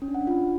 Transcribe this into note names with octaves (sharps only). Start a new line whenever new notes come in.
C#4
D4
F#5
D4
F4